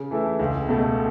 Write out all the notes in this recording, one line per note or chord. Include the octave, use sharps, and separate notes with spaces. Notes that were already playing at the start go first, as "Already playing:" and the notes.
Already playing: C#3
E3 A3 E4
C#2
B2 A3